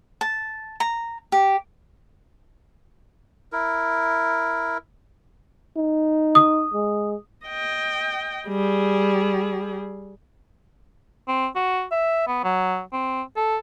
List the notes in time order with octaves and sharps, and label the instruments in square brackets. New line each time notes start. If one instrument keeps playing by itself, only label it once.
[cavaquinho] A5
A#5
G4
[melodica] E4 A#4
[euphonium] D#4
[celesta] D#6
[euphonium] G#3
[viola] D#5 G5
G3 G#4
[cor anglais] C4
F#4
E5
B3
F#3
C4
A4